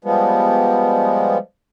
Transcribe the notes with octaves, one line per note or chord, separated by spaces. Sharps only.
F3 G3 G#3 B3